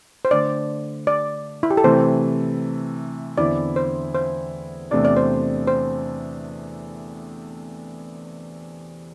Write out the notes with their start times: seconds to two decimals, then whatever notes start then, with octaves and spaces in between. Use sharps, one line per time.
0.25 C5
0.31 D3 A3 D4 D5
1.07 D5
1.63 E4
1.70 G4
1.77 A4
1.84 C3 E3 A3 C5
3.38 E2 D3 C4 E4 D5
3.76 C5
4.14 C5
4.91 E2 C3 A3 D4 D5
5.05 D5
5.17 C5
5.68 C5